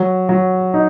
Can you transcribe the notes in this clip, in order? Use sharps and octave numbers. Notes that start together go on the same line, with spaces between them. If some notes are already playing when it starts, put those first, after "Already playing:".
Already playing: F#3
F#3
D#4